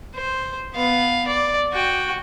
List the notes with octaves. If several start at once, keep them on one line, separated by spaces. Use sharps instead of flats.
C5
B3 F5
D5
F#4 G5